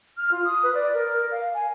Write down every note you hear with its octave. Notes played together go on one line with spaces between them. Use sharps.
F6
F4
D#6
B4
D5
A#4
F5
G#5